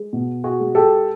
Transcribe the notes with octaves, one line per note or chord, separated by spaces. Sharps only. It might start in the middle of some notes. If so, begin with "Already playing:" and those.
Already playing: G#3
B2
F#4 G#4
G#3
G4 A4